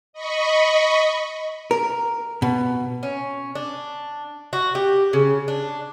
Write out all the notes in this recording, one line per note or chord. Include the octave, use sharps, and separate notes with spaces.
D#5 B5 C#6
A#4
B2
C#4
D4
F#4
G4
C#3
D4